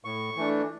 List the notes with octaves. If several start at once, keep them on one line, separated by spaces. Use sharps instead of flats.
A2 C#6
E3 A3 D4